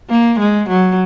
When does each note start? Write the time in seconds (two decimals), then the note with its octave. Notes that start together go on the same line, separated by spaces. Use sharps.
0.10 A#3
0.39 G#3
0.69 F#3